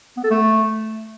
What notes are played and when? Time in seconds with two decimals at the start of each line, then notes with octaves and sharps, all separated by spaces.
0.17 B3
0.24 A4
0.31 A3